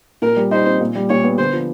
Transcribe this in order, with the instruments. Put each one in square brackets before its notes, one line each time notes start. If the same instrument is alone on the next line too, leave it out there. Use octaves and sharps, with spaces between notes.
[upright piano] A#2 [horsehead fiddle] A#4
[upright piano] G3
[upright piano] D#4 [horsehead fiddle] C5
[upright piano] C4
A#2
G3
[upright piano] A#2 [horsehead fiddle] C#5
[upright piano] B3
[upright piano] D3 [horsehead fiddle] C5
[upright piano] F3